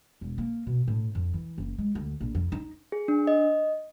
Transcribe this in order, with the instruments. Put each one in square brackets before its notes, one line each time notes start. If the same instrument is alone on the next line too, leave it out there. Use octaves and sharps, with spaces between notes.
[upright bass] E1
A#3
B2
A2
F2
E3
F#1
G#3
D2
A#1
F2
D#4
[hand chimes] G#4
D4
D#5